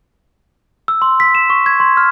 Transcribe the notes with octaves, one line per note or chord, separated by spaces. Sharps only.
E6
C6
B6
E7
C#6
G#6
C6
F6